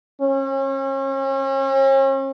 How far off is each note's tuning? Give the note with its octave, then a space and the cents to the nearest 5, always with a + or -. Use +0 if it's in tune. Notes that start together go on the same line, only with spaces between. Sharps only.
C#4 -40